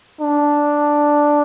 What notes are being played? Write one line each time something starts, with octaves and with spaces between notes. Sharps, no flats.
D4